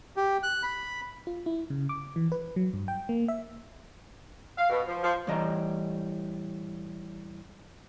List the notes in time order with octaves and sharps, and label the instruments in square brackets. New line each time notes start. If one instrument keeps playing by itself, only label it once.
[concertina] G4
F#6
B5
[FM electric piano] F4
E4
C#3
D6
E3
B4
F#3
G2
G5
A#3
E5
[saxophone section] F5
B2
F3
F3
[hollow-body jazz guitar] A2 E3 G3 D#5 A#5